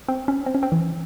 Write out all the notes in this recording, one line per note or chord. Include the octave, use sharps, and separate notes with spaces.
C4
C#4
C4
C#4
C4
E3